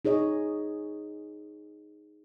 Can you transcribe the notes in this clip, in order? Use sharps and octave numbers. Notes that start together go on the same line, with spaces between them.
D#4 G#4 C#5 D#5